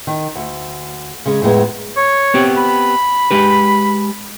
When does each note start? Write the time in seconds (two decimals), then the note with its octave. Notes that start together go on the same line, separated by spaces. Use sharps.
0.07 D#3
0.35 D2
1.26 C#3 G#3
1.42 F2 A2 G#3 B3
1.96 C#5
2.34 B3 C4 G4
2.57 B5
3.31 G#3 G4 B4